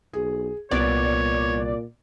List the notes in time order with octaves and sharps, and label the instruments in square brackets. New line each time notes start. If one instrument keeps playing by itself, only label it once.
[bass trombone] B1 [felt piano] G#4
[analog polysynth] C2 D5 [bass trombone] A#2 [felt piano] B3 [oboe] C#5